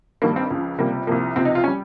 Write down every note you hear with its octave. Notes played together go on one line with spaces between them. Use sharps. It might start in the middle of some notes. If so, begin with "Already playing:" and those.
G2 D#3 G3 A#3
C4
C#2 C#3 F3
C#2 C3 G3 A#3
C2 C3 F3 A#3
C#2 C3 F3 C4
D#4
F4
C#4
G3